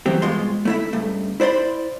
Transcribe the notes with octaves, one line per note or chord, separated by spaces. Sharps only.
G2 E3 F#3 C4 G4
G2 B2 G#3 F4 C6
A3 E4 E5
C#2 G2 A3
E4 C5 D5 B5 C6